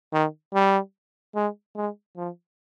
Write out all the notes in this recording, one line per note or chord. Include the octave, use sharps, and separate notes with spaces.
D#3
G3
G#3
G#3
F3